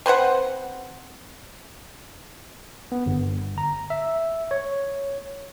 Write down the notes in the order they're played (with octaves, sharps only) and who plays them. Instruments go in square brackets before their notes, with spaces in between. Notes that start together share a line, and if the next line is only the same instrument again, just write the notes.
[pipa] C4 B4 C5 F#5
[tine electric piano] B3
G1
A#5
E5
C#5